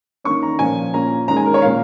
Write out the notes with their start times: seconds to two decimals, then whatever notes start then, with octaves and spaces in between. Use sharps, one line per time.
0.24 D#3 A#3 C#4 C#6
0.43 A#5
0.59 A#2 F3 C#4 G#5
0.94 A#2 A#3 C#4 A#5
1.28 D#3 G#3 C#4 A#5
1.37 G#5
1.46 A#4
1.54 C#5
1.62 A#2 A#3 C#4 F5